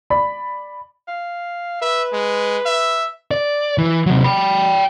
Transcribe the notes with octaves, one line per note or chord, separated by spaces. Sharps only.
D5 B5
F5
B4 E5
G#3
E5
D5
E3
C3 F#3
G5 B5